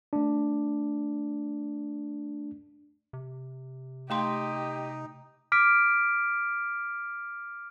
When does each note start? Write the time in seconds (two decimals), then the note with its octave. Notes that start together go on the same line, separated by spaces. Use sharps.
0.13 A3 D4
3.13 C3
4.10 A3 D#4 G4 D#5 G5 C6
5.52 D6 F6 B6 D7